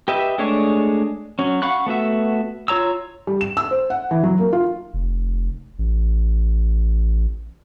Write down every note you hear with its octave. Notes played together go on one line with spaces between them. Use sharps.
G4 B4 D#5 E5
G#3 A3 D4 G#4 C#5
F#3 C#4
F5 F#5 B5 C#6 F#6
A3 B3 F#4 E5
F4 C#5 A#5 E6
G3
E7
E6
C5
F#5
E3
F#3
A#3
F4
F1
A1